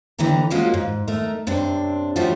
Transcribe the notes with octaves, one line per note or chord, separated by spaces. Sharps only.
D#2 D3 E3 G5 A#5
F3 G#3 A#3 C#4 F4 F#4
G#2
A3 D#4 A#4
F#2 C3 C4 D4
F3 G3 A3 C#4 F4 F#4